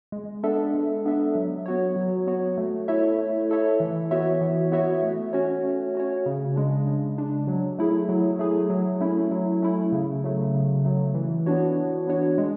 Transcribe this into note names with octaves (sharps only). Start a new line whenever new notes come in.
G#3
B3 D4 A4 E5
G#3
B3 D4 A4 E5
F#3
B3 F#4 C#5
F#3
B3 F#4 C#5
A3
E4 A4 C#5 E5
A3
E4 A4 C#5 E5
E3
B3 F#4 C#5 E5
E3
B3 F#4 C#5 E5
A3
C#4 F#4 C#5
A3
C#4 F#4 C#5
C#3
G#3 D4
C#3
G#3 D4
F#3
A3 E4 G#4
F#3
A3 E4 G#4
F#3
A3 C#4 E4
F#3
A3 C#4 E4
C#3
F#3 A3
C#3
F#3 A3
E3
B3 D4 F#4 C#5
E3
B3 D4 F#4 C#5
G#3